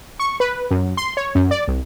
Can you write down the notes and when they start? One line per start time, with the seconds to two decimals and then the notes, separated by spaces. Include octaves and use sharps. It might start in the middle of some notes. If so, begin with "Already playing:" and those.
0.20 C#6
0.40 B4
0.71 F#2
0.97 C6
1.17 C#5
1.35 F#2
1.51 D5
1.68 C2